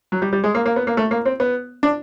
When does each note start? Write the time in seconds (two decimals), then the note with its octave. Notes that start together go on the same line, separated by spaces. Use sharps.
0.12 F#3
0.22 G3
0.33 G3
0.44 G#3
0.55 A#3
0.66 A#3
0.76 B3
0.87 A#3
0.97 A3
1.11 A#3
1.25 C4
1.40 B3
1.83 D4